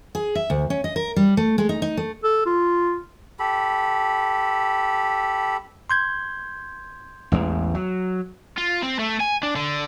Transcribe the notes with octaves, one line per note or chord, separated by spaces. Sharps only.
G#4
E5
D2
C#4
D#5
A#4
G3
A3
G#3
D#4
D#4
A3
A4
F4
G4 A4 B5
C6 G6 G#6
A1 E2 G#3
F#3
F4
C4
A3
G#5
D4
D3